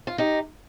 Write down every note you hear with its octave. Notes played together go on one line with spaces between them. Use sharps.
F4
D#4 G4